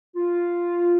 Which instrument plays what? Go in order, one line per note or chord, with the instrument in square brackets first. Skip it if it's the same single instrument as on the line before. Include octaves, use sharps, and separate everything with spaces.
[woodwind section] F4